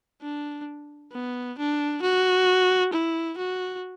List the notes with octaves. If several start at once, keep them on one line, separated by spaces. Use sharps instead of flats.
D4
B3
D4
F#4
E4
F#4